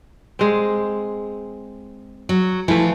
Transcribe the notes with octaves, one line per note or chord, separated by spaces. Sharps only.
G#3 C4
F#3
E3 F3 A3